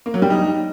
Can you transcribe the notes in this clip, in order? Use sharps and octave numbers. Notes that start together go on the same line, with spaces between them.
A#3
F#3
G3
D#4